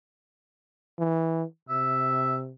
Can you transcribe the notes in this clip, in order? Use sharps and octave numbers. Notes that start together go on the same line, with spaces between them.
E3
C3 E5